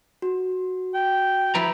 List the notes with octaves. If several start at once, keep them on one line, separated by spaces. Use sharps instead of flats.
F#4
G5
F3 E4 B4 A#5